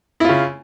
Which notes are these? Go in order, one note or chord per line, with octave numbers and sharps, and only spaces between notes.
C#3 E4 F4